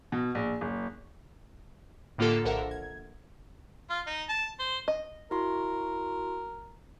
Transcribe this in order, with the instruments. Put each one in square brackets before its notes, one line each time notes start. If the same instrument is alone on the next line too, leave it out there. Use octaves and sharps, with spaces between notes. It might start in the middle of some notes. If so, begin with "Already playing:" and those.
[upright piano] B2
A#1
F#1
[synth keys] A2 D3 A#3 F4 G4 A4
A#1 D3 A4 A#4 E5 F#5
G#6
[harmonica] F4
D#4
A5
C5
[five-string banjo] D#5
[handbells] E4 F#4 C6 [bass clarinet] A#4